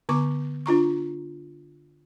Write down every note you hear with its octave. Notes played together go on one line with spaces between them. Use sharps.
D3 B3 C#6 D6
D4 F4 A#5 C#6